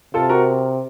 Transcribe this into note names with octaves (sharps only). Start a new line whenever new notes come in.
C3 F4 A4
F#4 A#4